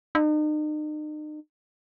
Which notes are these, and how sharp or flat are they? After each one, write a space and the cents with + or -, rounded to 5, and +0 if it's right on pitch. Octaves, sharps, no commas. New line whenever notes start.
D#4 -40